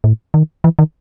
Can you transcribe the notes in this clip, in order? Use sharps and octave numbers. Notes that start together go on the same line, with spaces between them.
A2
D#3
E3
D#3